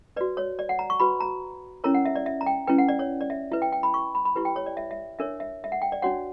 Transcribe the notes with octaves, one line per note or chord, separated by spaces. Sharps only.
F#4 B4 D5
C#5
D5
F#5
A#5
C#6
F#4 B4 B5
A#5
C#4 E4 A#4 C#5 A#5
F#5
E5
D5
E5
A#5
G5
C#4 E4 B4 G5
F#5
D5
C#5
D5
E5
E4 B4 E5
G5
G5
B5
C#6
B5
B5
E4 G4 B4
G5
C#5
D5
E5
E5
D4 A#4 C#5 E5
E5
E5
F#5
G5
D5
D4 F#4 C#5 F#5